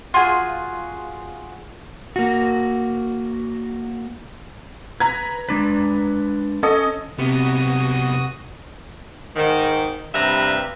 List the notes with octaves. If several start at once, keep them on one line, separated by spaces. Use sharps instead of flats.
F4 F#4 G#4
A#3 F#4
B4 A#5 G#6
G#3 D4 B4
C#4 A4 D#5
C2 C3 B3 F#4 D#6
G#2 D#3
G2 C3 G3 B4 E5 A#5